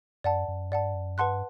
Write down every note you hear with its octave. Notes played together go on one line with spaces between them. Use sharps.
F#2 D5 F#5 A5
F#2
G2 D5 F#5 A5
F#2
G2 B4 F#5 A5 C6 F#6